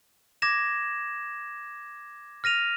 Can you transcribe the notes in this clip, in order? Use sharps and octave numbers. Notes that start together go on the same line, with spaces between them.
D6 G#6 A#6 E7
F6 A#6 D#7 F7